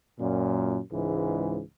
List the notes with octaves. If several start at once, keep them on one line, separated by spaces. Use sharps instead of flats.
F#2 A#2
C#2 G#2 E3